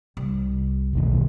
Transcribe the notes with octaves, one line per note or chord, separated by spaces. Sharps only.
C2
E1 B1 D#3